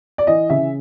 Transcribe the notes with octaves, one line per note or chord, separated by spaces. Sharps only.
D5
E3 D#5
C#3 E5